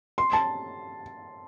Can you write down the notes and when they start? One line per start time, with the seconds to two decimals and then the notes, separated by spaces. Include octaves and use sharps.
0.18 C6
0.33 A5